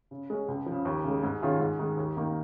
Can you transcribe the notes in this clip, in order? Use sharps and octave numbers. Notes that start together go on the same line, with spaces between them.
C#3
G#3 C#4
C#2
F3
C#3
D#2
C#3 G#3
G#2
D#3 C#4 F4 G#4
G#2
D#3 G#3
D#2
D#3 A#3 D#4